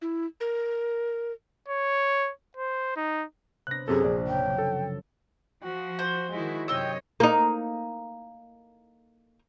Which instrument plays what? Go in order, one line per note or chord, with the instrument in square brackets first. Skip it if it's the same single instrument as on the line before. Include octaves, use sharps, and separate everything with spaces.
[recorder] E4
A#4
[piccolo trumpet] C#5
C5
D#4
[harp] C3 B3 D4 [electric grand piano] F#6 A#6
[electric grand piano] F#2 C3 A4 [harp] C4 [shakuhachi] G#4
[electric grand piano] A#1 D5
[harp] F#2 C#3 F3 [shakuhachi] G5
[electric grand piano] A4
[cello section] F3 [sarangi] F#4
[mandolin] C5
[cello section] D#3 E4 F#4 [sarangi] G#3
[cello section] F#2 C3 D#5 [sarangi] C#5 [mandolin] G5 E6
[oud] A#3 D#4